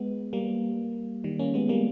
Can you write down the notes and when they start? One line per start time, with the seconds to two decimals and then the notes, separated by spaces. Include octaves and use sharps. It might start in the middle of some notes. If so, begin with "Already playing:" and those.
Already playing: G#3 B3
0.33 G3 A#3
1.24 D#3 G3
1.39 A#3 C#4
1.54 G#3 B3
1.69 G3 A#3